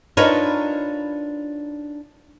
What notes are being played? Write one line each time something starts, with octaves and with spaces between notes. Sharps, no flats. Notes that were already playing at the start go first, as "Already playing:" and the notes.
D4 D#4 F4 A#4 B4 C#5